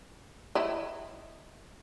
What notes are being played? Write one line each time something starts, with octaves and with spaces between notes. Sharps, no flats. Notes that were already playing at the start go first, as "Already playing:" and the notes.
E4 D#5